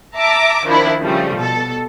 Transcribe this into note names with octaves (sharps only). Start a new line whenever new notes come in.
E5 A5 A#5 D6
D#3 F3 D4 E4
C#3 F3 G3 A3
B2 A4